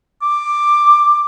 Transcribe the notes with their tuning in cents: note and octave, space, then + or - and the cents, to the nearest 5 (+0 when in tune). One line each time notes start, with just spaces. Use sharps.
D6 +10